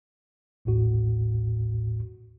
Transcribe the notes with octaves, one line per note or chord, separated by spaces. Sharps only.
A1 D#2 A2 F#4